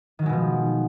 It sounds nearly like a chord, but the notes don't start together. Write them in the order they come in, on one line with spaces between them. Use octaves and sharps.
D#3 F#3 G#3 B2 F3